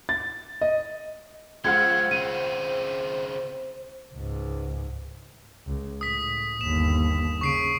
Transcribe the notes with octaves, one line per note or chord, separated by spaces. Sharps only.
A6
D#5
C#2 F3 C5 F#5 C6 F6 G#6
C#3 C4 D#7
C#2 G#2
C#2
A2 D#6 B6
G1 D#2 E7
C#3 C#6 C7 D7